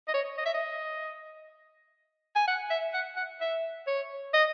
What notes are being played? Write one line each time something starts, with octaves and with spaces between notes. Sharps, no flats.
D#5
C#5
D#5
E5
D#5
G#5
F#5
E5
F#5
F#5
E5
C#5
D#5